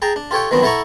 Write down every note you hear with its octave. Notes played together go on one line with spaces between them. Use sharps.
G#4 G5 A5 A#5
D4
F4 G4 A4 C#5 G5
D#3 F3 F#3 B3 C4 D4
E4 A4 E5 F#5 A#5 C#6